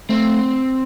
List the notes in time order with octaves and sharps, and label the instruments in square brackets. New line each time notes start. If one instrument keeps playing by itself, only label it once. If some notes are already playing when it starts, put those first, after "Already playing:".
[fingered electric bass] A3 [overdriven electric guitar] C4